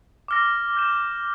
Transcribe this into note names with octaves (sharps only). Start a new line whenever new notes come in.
D6 F6 A#6
G6 A#6 E7